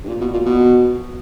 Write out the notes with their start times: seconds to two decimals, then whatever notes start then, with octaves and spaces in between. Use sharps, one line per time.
0.04 G2
0.08 A#2
0.21 B2
0.33 A#2
0.46 B2